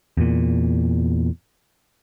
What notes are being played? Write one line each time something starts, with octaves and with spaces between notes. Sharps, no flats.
E2 A#2